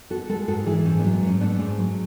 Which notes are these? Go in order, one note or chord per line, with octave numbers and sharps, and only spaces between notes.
B3 F#4 A4
G#3 F#4 A4
G#2 F#4 A4
E3 E4 G#4
G#2 C#4
B3 D4
F#3
B3
G#2 C#4
A3 B3 D4
G#2
F#3